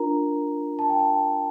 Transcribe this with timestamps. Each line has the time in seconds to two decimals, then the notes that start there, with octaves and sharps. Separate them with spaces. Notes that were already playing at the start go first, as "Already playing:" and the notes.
Already playing: D4 F4 A#4 A#5
0.79 A5
0.90 G5
0.99 A5